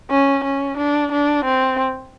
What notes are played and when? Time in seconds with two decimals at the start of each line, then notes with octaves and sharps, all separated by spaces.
0.11 C#4
0.44 C#4
0.78 D4
1.12 D4
1.45 C4